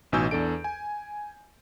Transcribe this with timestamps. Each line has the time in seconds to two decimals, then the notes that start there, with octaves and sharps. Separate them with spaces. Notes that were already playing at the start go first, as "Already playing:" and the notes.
0.12 A1 B2 D#4 G#5 E6 G6
0.31 E2 D4 A4 D7
0.64 G#5